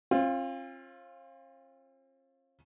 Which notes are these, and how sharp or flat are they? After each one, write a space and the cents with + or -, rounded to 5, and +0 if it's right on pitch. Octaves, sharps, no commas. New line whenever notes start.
C4 +45 F4 +0